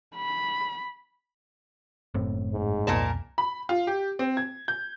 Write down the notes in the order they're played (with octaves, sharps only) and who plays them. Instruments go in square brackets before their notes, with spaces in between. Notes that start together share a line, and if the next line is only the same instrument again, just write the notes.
[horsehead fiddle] B5
[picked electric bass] F#1 A2 C4
[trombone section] G#2
[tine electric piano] C2 F2 [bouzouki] A#2 A#4 A5
[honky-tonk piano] B5
F4
G4
C4
G#6
G6